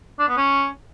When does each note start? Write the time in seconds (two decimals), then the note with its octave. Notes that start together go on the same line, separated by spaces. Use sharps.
0.19 D4
0.28 B3
0.37 C#4